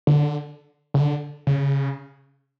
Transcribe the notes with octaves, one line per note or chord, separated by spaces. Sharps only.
D3
C#3
D3
C#3